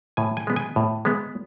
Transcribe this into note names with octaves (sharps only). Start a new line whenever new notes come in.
A2 G#5
G#5
G#3 B3
G#5
A2
G#3 B3